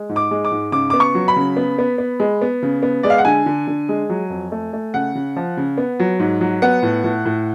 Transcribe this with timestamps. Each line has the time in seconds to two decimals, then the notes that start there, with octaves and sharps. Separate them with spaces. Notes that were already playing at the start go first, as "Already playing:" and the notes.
Already playing: G#3
0.09 G#2
0.16 D6
0.31 G#3
0.45 D6
0.52 G#2
0.72 C#3 D6
0.90 B3 D6
1.00 C#6
1.15 F#3
1.28 B5
1.36 C#3
1.57 B3
1.78 B3
1.98 B3
2.20 G#3
2.42 B3
2.62 C#3
2.82 B3
3.03 G#3 D5
3.10 F5
3.18 F#5
3.25 D3 G#5
3.46 D3
3.68 D3
3.89 G#3
4.10 F#3
4.30 F2
4.52 A3
4.73 A3
4.94 C#3 F#5
5.15 C#3
5.36 F3
5.57 C#3
5.78 B3
6.00 F#3
6.19 G#2
6.41 F#3
6.62 B3 F#5
6.83 A2
7.04 A2
7.25 A2